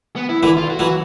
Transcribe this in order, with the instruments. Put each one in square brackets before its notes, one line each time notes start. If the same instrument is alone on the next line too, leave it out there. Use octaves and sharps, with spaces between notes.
[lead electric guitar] B3
E4
[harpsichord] D3 E3 [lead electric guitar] E4
[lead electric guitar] F4
F#4
[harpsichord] E3 F#3
[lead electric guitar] F#4